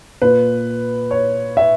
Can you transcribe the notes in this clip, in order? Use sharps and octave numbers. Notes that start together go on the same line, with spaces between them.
A#2 B4
C#5
E5